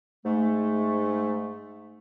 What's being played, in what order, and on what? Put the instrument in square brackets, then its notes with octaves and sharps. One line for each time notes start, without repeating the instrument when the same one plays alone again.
[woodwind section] G#2 A3